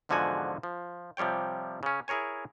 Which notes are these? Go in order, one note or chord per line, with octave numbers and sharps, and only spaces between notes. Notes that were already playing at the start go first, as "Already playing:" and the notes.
E2 G#2 D3 F3 F#4 G#5
F3
C3 F3 G3 C#5 G5
C#3 C#4
E4 G#4 A#4 C#5 G#5